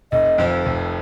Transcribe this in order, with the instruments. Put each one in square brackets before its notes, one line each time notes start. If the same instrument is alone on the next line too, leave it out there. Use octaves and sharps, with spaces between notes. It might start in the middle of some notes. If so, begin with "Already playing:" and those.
[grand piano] F1 [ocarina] D#5
[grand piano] F2 F3
F1